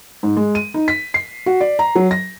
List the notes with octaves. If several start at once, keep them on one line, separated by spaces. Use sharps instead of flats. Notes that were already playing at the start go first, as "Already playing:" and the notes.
G#2
G#3
D#7
D#4
B6
C7
F#4
D5
A#5
F#3
A#6